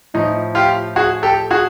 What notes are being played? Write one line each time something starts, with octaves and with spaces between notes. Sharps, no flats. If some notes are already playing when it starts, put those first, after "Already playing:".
A2 F3 D#4
F4 G4
F#4 G#4
G4 A4
F#4 G#4